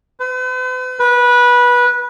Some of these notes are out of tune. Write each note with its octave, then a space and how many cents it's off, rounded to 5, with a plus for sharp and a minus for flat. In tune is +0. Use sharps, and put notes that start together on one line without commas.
B4 +45
B4 -20